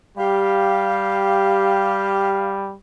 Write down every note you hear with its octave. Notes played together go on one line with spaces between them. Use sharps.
G3 G4 F5